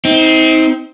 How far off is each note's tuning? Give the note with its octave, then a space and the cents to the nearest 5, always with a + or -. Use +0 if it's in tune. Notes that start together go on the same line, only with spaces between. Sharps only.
C4 +0 D#4 +35